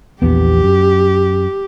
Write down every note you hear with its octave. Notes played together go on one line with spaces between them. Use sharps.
A#1 E2 B3 G4
F#2